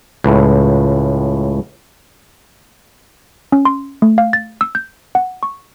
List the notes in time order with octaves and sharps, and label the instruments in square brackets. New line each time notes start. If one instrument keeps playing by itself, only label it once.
[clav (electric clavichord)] C#2 A2
[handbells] C#4
C6
A3
F5
A6
E6
G6
F#5
C#6